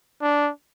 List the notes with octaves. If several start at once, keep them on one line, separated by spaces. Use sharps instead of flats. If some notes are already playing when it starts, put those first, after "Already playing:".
D4